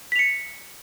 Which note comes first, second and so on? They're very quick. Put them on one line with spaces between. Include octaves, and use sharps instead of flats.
B6 F7 C#7